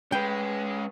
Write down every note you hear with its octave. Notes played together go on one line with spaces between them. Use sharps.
G#3 C#4 B4 G5